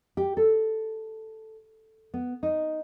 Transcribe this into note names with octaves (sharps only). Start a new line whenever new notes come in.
G4
A4
B3
D#4